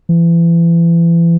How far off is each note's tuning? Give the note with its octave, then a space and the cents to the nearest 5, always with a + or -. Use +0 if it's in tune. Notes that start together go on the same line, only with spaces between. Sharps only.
E3 +35